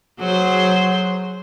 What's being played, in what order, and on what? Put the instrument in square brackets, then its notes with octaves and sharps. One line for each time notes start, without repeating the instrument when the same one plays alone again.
[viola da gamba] F#3 G#4 C5